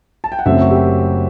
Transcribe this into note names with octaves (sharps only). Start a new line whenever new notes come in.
A5
G5
F#5
F#1 F#2 F#3 A3 C4 E5
F#4
G4